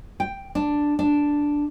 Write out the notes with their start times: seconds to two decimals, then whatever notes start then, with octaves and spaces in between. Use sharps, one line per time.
0.20 G5
0.55 D4
0.99 D4